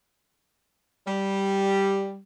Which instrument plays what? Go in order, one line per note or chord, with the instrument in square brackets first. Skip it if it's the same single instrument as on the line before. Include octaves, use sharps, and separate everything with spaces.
[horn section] G3